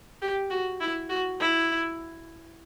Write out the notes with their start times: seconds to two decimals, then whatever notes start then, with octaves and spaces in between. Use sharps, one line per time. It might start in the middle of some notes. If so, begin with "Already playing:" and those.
0.22 G4
0.51 F#4
0.81 E4
1.10 F#4
1.40 E4